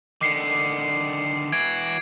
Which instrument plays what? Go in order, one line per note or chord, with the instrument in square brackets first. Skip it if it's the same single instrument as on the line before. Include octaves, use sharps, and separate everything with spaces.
[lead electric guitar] D3 D#3 [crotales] D6 C7 C#7
[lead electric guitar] E3 F#4 [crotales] G#6 D7